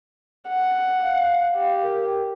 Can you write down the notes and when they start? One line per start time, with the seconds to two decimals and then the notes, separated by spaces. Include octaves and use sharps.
0.49 F#5
1.02 F5
1.54 G4
1.83 A#4